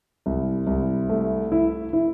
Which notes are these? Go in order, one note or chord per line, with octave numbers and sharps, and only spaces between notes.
C2
C2
A3
E4
E4